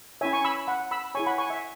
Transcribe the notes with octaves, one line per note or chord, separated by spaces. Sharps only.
C#4 E4 C#5 E5 G#5
G#5 C#6
B5 E6
F#5 B5
B5 E6
E4 G#4 C#5 G#5 C#6
F#5 B5
G#5 C#6
E5